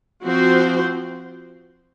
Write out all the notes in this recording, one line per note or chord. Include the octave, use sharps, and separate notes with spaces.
F3 C4 F#4 C5